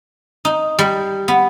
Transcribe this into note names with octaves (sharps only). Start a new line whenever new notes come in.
D#4
G3
B3